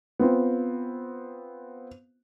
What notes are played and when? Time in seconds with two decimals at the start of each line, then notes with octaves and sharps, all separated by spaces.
0.19 B3 C4 F4